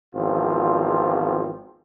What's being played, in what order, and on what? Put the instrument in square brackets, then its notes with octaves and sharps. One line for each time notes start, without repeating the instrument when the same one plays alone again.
[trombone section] G#1 E2 F3 C4 F4